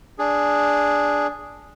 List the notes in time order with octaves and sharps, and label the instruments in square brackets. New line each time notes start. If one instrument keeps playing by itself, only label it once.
[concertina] D4 G#4